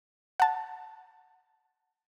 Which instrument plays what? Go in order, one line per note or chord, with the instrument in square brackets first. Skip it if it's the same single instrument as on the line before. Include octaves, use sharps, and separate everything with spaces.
[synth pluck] F#5 A5